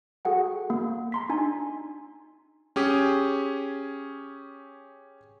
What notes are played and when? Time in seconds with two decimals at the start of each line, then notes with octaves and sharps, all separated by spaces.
0.25 F#4 G#4 A4 F#5 G5
0.70 A#3 F5
1.12 A#5 C6 B6
1.29 D4 D#4 G#5
2.76 C#4 G4 G#4